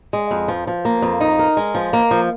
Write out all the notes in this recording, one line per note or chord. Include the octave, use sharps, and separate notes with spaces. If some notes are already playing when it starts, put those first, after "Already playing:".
G#3
F2
F3
F3
A#3
F2
D#4
A#4
G#3
F3
A#3
F3